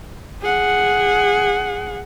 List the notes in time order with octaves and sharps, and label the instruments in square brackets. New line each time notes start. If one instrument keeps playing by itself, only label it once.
[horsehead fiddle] G#4 F#5